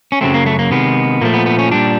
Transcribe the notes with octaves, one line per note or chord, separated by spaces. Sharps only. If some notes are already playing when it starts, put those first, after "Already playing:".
C#4
F#2 C#3 F#3 A3 C4
A#3
A3
A#3
C3 D#3 G#3 B3
A#2 F3 A3 A#3
B3
B3
C#4
A#2 G3 D4